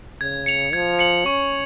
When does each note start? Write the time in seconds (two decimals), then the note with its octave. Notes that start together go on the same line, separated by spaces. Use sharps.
0.21 C#3 G#6
0.46 C#7 F7
0.73 F3 G#6
0.99 C#7 F#7
1.26 C#4 C#6